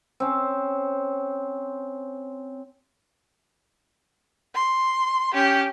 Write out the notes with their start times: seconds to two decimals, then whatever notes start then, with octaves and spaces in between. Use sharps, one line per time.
0.20 C4 C#4
4.54 C6
5.34 C#4 G4